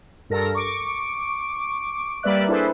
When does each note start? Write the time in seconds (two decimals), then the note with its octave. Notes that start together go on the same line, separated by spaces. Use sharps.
0.30 G2 A4 A#4 A#6
0.55 C#6 D6 D7
2.23 G3 A#3 B4 D5 E5 F#6
2.48 D4 E4 G#4 A4 B4 C5